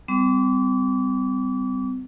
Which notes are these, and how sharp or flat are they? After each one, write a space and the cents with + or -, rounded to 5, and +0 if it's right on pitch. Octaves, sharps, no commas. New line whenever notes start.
G3 +0 C4 -30 D6 -30